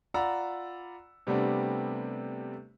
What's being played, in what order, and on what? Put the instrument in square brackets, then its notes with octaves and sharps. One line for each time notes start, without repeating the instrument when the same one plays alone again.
[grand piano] F4 D5 F#5 A#5 B5 E6
C3 G3 A3 B3 C4 D4